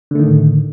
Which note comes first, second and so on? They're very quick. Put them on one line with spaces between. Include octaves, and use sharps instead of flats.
D3 A3 D#3 A2